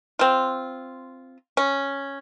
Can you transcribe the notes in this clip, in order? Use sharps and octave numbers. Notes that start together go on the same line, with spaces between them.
C4 F4
C#4